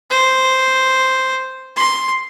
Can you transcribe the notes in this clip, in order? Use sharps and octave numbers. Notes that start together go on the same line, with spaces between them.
C5
C6